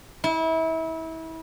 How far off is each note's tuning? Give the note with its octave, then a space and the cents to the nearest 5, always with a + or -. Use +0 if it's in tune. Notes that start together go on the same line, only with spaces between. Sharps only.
E4 -30